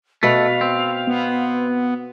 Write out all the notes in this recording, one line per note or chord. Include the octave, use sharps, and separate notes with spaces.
B2 A3 B4 F5
C4
B3